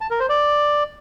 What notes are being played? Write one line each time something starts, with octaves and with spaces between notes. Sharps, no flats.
A5
A#4
C5
D5